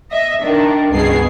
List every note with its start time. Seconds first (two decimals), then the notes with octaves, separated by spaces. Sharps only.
0.11 D#5 E5
0.42 D#3 D4
0.92 C#2 G2 B2 G#4 C7